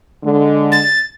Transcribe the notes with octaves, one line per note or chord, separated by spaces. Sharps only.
D3 G#3
A6